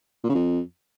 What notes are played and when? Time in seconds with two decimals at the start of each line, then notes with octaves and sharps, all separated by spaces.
0.24 A#2
0.29 C#3
0.35 F2